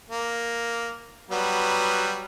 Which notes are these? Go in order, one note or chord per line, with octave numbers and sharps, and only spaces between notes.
A#3
F#3 G3 B3